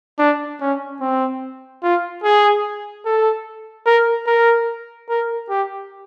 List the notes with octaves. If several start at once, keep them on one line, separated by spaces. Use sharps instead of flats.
D4
C#4
C4
F4
G#4
A4
A#4
A#4
A#4
G4